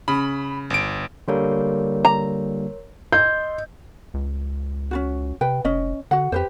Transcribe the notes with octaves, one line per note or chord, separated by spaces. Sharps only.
C#3 B5
G1 D7
D3 G3 A#3 A#4 C#5 C6
A#5
D#5 C6 G6
C#2
C#4 F4 F#4
C3 B4 G5
F1 C#4 D#5
D3 F#4 F#5
F2 G4 B4 C5